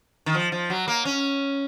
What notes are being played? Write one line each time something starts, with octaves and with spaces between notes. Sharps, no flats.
D#3
F3
F3
F#3
A#3
C#4